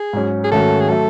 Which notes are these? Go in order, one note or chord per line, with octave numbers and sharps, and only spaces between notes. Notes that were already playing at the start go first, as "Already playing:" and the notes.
Already playing: G#4
G#2 F#3 C#4
G#4
G#2 D#3 A3 C#4 F#4 A4
G#4
F#3 A3 A4